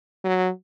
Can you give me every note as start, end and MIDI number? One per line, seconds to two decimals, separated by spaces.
0.24 0.50 54